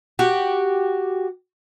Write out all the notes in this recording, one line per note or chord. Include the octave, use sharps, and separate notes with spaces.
F#4 G4